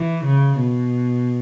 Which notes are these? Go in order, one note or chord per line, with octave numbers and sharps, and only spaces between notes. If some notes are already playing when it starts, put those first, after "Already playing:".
Already playing: E3
C#3
B2